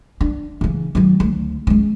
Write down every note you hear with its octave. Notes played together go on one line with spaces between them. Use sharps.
D4
C#3 E3
D#3 F#3
D2
G#3 C#4